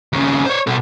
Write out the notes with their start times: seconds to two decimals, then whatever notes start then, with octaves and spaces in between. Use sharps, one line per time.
0.13 D#2 C#3
0.46 C5 C#5
0.67 B2 A4